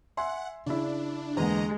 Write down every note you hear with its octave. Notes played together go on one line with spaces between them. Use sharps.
E5 F#5 G#5 C6
C#3 D4 E4
E2 D3 G#3 A#3 D#5 A#5